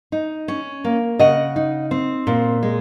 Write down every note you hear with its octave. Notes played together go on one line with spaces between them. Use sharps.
D#4
C#4
A#3
C#3 D#5 F#5
D#4
C4
A#2
G#3